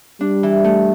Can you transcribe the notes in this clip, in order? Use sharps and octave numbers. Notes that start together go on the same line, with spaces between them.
G3 D4
E3
A3